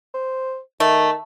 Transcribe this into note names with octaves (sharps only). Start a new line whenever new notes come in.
C5
D#3 A3